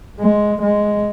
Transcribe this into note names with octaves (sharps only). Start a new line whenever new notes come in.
G#3
G#3